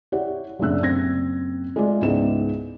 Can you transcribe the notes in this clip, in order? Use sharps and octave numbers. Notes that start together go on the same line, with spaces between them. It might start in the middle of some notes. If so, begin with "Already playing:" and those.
E4 G4 C#5 D5 F#5
F#1 C2 A2 D4 E6 F#6
F#1 C4 G#6 A#6
G#3 A3 F4 G#4 D5
C#2 G#2 B3 E4 D5 E7